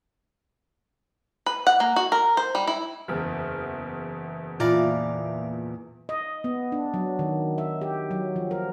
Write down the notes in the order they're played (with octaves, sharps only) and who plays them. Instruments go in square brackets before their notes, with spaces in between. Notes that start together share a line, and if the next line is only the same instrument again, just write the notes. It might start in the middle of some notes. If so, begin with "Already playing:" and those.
[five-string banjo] B4
F#5
A#3
F#4
A#4
C5
G3
E4
[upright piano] F#1 E2 [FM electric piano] F6
[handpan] A#2 [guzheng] E3 A#4 D5 [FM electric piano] F4 E5 F5
[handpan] D#5
B3
D4
F#3
D#3
E5
G4
F#3
F3
A#4